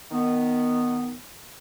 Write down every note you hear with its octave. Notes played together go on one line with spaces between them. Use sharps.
D#3 B3